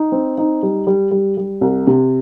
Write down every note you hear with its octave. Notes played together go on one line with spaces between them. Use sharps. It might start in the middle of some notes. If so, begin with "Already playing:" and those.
Already playing: D#4
C4
D#4
G3
G3
G3
G3
C2
C3